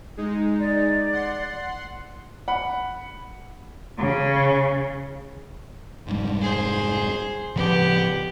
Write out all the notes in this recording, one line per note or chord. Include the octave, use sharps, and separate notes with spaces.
G#3 D#4
D5
F#5 C6
F#5 B5
C#3
F1 G#2 G3
G#4 C5
A2 C#3 F3 B3 G4